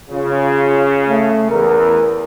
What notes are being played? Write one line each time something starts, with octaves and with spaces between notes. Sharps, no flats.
C#3 F4
A3
E2 A#4